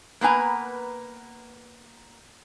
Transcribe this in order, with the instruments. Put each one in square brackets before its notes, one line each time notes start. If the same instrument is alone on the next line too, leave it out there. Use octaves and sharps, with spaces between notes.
[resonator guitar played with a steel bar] A#3 B3 B4 G#5 A#5